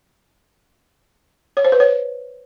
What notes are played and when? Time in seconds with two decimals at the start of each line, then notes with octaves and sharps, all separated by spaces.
1.57 C#5
1.65 C5
1.72 B4
1.80 C#5